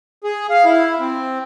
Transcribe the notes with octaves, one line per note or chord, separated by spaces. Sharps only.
G#4
F5
E4
C4